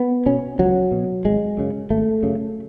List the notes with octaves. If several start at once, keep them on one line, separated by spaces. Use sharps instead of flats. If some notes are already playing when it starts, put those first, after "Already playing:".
Already playing: B3
B2 C#4
C#2 F#3
B2
G#1 G#3
F#2 C#3
G#1 A3
F#2 C#3